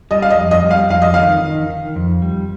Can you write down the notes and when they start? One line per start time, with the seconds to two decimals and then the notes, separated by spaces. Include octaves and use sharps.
0.11 G3 D#5
0.22 F5
0.30 D#5
0.37 F2
0.51 D#5
0.64 G3
0.71 F5
0.90 F2 F5
1.02 D#5
1.14 D#3 F5
1.43 D#3
1.70 D#3
1.96 F2
2.22 G3